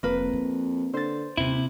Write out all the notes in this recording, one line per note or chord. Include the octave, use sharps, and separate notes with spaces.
F1 F2 A#3 B4
E4
D3 C5 A6
D#1 D#2 C3 E4